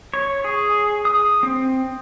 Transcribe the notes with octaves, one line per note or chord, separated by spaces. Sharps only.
C#5
G#4
D#6
C4